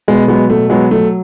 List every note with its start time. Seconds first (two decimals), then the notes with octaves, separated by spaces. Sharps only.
0.08 B2 G#3 B3
0.28 F#3 G#3 B3
0.50 B2 A3
0.70 F#3 G#3 B3
0.91 F#3 A3